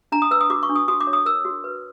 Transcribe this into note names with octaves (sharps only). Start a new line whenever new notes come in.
D4 A#5
D#6
B4 E6
D#6
F#4 D6
C#6
D4
D#6
F#4 D#6
D6
C#5
D#6
A#4 E6
F#4
B4